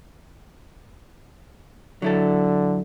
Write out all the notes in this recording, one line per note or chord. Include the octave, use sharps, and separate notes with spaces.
D3 F#3 E4 A4